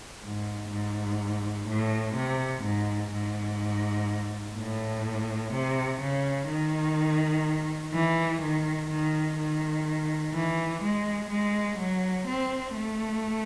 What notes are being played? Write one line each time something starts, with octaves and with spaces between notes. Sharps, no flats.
G#2
G#2
A2
C3
G#2
G#2
A2
C3
C#3
D#3
E3
D#3
D#3
D#3
E3
G#3
G#3
F#3
C4
A3